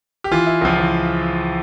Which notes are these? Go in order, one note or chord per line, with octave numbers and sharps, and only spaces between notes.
G4
E3 F4
E4
C#2 F3
E3